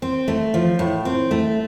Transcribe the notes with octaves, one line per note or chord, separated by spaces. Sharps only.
C4
A3
F3
A2
C4
A3